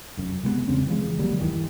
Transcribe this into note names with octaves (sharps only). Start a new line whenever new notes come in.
F1 F#2
C3 G#3 A3 B3
E2 C#3 C4 C#4
E3 F3 G#3
D3 F#3 G3 A#3
G1 D#2 D#3 E3